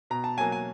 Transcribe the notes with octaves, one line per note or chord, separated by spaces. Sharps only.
B2 A#5
A5
F#3 A#3 G#5
G#5